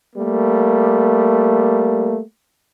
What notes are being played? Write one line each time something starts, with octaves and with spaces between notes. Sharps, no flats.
G3 A3 A#3